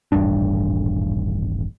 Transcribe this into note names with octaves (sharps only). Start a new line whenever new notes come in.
D#1 A1 G2 D4